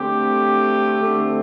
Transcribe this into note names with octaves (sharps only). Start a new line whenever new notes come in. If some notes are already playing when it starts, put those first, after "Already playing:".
Already playing: D3 A3 C4 G4
D3 A3 C4